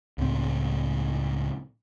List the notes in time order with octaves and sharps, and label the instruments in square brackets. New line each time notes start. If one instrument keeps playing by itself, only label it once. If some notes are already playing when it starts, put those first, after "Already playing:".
[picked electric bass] C#2 A2 C4